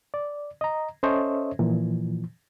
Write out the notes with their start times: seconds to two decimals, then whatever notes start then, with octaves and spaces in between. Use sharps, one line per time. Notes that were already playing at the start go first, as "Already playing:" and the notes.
0.14 D5
0.61 D#5 A#5
1.03 C#4 A4 C5 C#5 D#5 E5
1.59 A#2 E3 F3